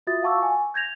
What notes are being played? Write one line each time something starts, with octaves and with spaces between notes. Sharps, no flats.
F4 F#4 E5 D#6 A6
F5 F#5 A5 C#6 D6 E6
G#5
G6 G#6 A#6 F7